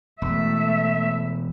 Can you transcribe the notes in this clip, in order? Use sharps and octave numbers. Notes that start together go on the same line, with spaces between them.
E1 A3 E5